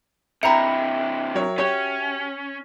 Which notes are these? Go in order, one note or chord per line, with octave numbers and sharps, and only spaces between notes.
C3 E3 C5 E5 G5 A#5 B5 C#7
F#3 A#4 C#5
C#4 F#4 G4 C#5